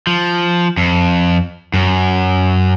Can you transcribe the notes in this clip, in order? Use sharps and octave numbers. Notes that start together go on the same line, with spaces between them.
F3
F2
F#2